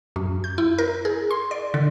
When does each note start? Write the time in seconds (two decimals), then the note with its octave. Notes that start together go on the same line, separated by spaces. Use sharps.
0.16 F#2
0.44 G6
0.58 E4
0.78 A#4
1.05 G#4
1.31 C6
1.51 D5
1.74 D3